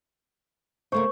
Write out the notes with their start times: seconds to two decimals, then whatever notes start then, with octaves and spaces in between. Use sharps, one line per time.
0.92 C#3 A3 A#3 C5 C#6